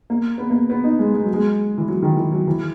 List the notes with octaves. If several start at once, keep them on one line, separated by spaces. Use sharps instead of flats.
A#3
B3
A#3
B3
D#4
G#3
G#3
F#3
G#3
E3
F#3
D#3
E3
F#3
E3